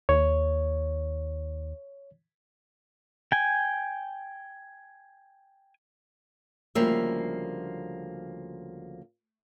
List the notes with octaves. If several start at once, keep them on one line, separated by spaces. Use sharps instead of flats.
D#2 C#5
G5 G#5
D2 C#3 F3 G3 A#3 E5